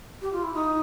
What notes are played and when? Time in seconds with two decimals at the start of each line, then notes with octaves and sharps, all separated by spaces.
0.21 G4
0.32 F4
0.43 E4
0.53 D#4